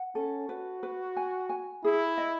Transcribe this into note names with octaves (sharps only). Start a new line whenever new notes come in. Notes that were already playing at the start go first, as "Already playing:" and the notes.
Already playing: F#5
C#4 A4
F#4 B4
B4
G#5
G#5
E4 G#4
D#5